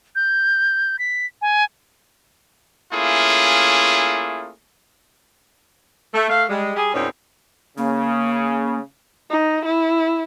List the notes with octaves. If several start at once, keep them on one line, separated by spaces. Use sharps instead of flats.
G6
B6
G#5
A3 A#3 C#4 E4 F4 G#4
A3
A3 F5
G3 G#3
G3 G4 G#4
E2 A#2 C4 C#4 D#4
C#3 A#3
D#4
E4